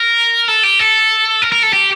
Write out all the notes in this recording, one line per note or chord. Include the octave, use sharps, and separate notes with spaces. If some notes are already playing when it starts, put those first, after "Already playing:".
Already playing: A#4
A4
G4
A4
A#4
A#4
A4
G4